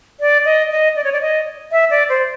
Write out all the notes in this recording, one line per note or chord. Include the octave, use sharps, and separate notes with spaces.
D5
D#5
D#5
D5
C#5
D5
D#5
E5
D5
C5